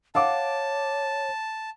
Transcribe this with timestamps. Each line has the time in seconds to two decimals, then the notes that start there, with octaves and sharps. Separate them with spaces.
0.15 C#5 F5 F#5 A5 D6